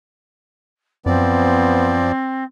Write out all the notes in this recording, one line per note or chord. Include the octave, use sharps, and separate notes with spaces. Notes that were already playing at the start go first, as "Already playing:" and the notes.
F#2 F3 B3 C4 D5